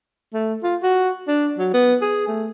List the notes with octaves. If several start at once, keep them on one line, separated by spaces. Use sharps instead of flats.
A3
F4
F#4
D4
F#3
B3
G#4
A3